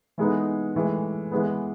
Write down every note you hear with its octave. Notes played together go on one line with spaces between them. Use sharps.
E3 G#3 B3 D#4
A2 E3 G#3
E3 G#3 B3